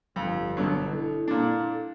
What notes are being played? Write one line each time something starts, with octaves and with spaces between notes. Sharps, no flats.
G1 F2
B2 D3 F#3
E4 A4
A#2 D4